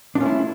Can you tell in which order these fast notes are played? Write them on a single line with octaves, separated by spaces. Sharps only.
D4 F4 C#4 A3 E4